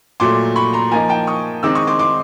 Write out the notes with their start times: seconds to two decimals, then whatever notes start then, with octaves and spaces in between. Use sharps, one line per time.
0.20 A#2 F#3 A3 C6 D6
0.56 B5 C#6
0.73 A#5 C6
0.91 F3 A#3 D#4 G#5 A#5
1.09 G5 A5
1.27 C#6 D#6
1.63 D#3 G#3 C4 D#4 D6 E6
1.75 C#6 D#6
1.87 C6 D6
1.99 C6 D6